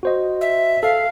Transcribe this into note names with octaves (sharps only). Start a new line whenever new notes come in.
F#4 C5 D#5
E5
A4 F5